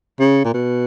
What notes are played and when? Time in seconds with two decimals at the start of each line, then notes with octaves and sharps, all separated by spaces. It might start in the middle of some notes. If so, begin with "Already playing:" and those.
0.20 C#3
0.44 A#2
0.54 B2